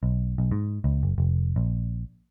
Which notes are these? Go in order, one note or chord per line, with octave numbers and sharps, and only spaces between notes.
B1
B1
G#2
C#2
F#1
F1
A#1